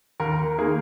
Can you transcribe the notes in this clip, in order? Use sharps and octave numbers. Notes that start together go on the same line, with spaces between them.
D#2 A#4
D#3 A#3 G#4